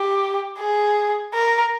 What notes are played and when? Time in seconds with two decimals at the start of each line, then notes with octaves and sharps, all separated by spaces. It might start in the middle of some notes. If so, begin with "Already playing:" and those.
Already playing: G4
0.59 G#4
1.35 A#4